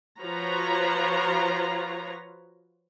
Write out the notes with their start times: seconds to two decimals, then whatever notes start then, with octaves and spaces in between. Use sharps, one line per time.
0.20 F3 F4 F#4 B4 C#5 A#5